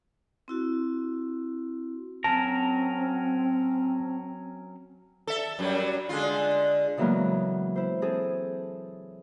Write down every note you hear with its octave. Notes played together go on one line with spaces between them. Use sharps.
C4 E4 F#4
F#3 C4 C#4 A#4 A5
A4 E5
F#2 F#3 G3
D3 G#3 F4
C#3 E3 F#3 G#3 A#3 B3
E4 C5
C4 G#4 A4